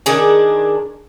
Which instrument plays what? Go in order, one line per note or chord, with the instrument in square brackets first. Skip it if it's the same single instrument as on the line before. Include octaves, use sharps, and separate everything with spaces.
[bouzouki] D#3 D4 G#4